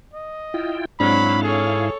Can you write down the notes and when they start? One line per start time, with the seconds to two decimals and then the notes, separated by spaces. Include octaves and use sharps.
0.14 D#5
0.54 E4 F4 G5
1.00 G#2 F#3 G#3 C4 D4 E4 F5 B5
1.43 G#4 A4 C#5